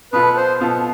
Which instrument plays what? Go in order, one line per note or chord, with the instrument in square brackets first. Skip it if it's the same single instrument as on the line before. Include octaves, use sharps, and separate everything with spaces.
[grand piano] B2 B3 F4 A4 [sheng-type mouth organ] B4
[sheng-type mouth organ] C5
[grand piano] B2 B3 F4 A4